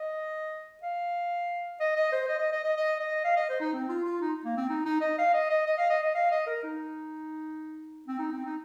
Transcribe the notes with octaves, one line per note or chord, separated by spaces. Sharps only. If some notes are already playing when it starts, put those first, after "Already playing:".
Already playing: D#5
F5
D#5
D#5
C5
D#5
D#5
D#5
D#5
D#5
D#5
F5
D#5
C5
D#4
C4
F4
F4
D#4
A#3
C4
D#4
D#4
D#5
F5
D#5
D#5
D#5
F5
D#5
D#5
F5
D#5
A#4
D#4
C4
D#4
C4
D#4